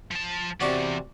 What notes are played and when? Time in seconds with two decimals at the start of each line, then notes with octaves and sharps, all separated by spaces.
0.11 F3 A5
0.61 E2 C3 F#4 D5 C#6